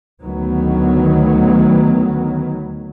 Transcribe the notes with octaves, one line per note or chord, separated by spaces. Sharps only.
D2 D#3 F#3 B3